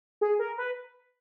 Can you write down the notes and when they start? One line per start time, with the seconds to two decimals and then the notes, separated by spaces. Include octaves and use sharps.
0.21 G#4
0.39 A#4
0.58 B4